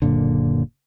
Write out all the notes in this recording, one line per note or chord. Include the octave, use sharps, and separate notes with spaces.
F#1 F#2 A#2 D3